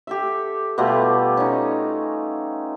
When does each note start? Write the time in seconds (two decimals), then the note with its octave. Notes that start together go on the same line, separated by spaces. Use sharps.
0.07 G4 A4 E5
0.78 B2 G3 A3 F4
1.37 C#4 D#4